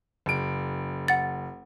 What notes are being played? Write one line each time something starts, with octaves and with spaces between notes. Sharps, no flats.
F#1 D7
F#5 A6